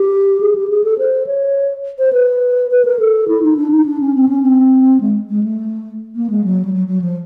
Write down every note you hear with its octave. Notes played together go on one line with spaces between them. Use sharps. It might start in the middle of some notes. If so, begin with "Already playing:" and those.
Already playing: G4
G#4
G4
G#4
A4
C5
C#5
C5
B4
B4
A#4
A4
E4
D#4
D4
D#4
D4
C#4
C4
C#4
C4
G#3
G#3
A3
A#3
G#3
F#3
G3
F#3
F#3
F3